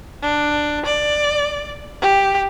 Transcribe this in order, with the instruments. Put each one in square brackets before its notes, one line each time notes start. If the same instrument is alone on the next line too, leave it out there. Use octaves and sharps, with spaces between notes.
[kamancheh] D4
D5
G4